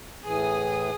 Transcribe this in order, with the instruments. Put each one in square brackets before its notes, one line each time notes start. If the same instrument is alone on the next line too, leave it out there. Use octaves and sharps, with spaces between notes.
[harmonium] A2 E3 [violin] G#4 D#6